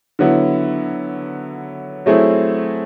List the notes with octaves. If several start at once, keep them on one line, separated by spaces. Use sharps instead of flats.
D3 F#3 B3 E4
F#3 A3 C4 E4 G#4